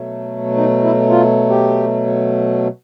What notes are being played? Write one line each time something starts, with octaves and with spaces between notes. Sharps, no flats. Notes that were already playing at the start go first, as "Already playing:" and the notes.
Already playing: B2 F#3 A3
D#4
E4
F4
G4